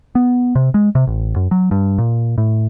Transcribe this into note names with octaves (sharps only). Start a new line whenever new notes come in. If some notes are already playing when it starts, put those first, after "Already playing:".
B3
C3
G#3
C3
A1
F#2
F#3
G2
A#2
A2